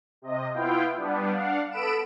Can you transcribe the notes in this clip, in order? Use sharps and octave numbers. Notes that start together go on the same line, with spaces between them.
C3 D#5
B3 E4 F4 F5 G5
G3 B3 D4
D4 F5 F#5
B3 A4 B5 D7 E7